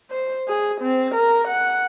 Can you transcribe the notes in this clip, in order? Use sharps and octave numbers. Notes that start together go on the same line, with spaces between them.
C5
G#4
C4
A#4
F#5